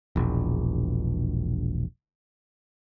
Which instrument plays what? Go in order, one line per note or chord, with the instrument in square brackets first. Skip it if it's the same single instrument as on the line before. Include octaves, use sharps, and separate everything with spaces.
[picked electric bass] E1 A#1